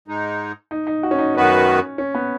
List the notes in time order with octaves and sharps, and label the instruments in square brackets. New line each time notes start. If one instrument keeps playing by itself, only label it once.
[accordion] G#2 G#3 D#4
[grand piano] D#4
D#4
F#4
C#4
D#4
[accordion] F#2 D#3 B3 F#4 B4 [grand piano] C#4
[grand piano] C#4
B3